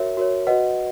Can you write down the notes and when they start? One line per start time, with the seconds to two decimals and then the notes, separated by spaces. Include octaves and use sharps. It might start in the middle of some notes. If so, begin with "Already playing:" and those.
Already playing: F#4 A#4 C#5 E5
0.17 F#4 A#4 C#5
0.47 F#4 B4 D#5 F#5